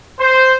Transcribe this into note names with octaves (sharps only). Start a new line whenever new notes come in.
C5